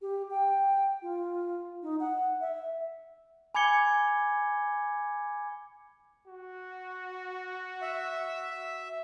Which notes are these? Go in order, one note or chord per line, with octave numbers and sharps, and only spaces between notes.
G4
G5
F4
D#4
F#5
E5
G#5 B5 D6 G#6 C#7 G7
F#4
E5